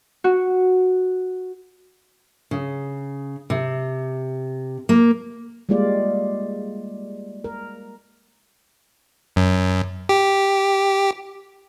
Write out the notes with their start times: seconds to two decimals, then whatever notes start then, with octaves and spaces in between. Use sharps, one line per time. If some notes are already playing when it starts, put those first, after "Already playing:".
0.24 F#4
2.51 C#3
3.50 C3
4.89 A#3
5.69 G3 G#3 A#3 F4 D5
7.44 A#4
9.36 F#2
10.09 G4